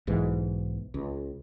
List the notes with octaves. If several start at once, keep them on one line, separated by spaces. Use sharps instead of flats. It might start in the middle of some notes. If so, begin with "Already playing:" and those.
B1 G#2 E3
C#2